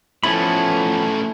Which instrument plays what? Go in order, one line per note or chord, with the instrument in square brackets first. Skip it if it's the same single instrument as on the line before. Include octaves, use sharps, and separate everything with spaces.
[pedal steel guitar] F3 B3 B5 [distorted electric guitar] A3 C#4 [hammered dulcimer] E4 A4